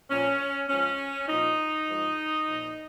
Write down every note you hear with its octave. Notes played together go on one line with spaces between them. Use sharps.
A#2 F3 C#4
G#2 F3 C#4
A#2 F3 D#4
G#2 F3
A#2 F3